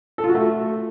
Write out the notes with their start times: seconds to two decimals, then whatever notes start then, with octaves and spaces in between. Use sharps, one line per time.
0.18 A4
0.24 F4
0.29 F#4
0.35 A3